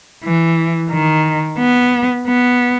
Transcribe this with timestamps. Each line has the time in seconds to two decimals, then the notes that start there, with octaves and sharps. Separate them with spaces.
0.24 E3
0.91 D#3
1.59 B3
2.27 B3